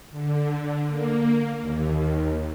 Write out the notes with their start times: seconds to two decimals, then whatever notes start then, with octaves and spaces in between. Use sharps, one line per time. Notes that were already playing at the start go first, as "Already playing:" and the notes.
0.11 D3
0.87 A#3
1.59 D#2